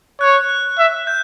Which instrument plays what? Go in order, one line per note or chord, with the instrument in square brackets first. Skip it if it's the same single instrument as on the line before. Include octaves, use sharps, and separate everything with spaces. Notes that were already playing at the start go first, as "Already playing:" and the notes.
[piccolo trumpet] C#5 [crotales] F#6
[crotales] F#6
[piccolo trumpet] E5
[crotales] G6